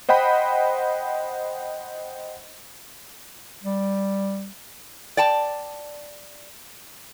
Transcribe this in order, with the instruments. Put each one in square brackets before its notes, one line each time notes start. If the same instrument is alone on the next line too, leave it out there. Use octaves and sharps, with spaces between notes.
[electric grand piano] C5 D#5 F#5 G5 B5
[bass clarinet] G3
[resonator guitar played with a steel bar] D5 G5 A5